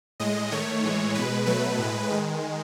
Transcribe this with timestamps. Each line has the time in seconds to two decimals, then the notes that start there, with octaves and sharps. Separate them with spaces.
0.20 A2 G#3 D#5
0.51 D#3 A3 C#5
0.83 A2 E3 G#3
1.15 B2 G#3 B4
1.46 B2 F#3 A3 B4
1.79 A2 G#3
2.11 D#3 G#3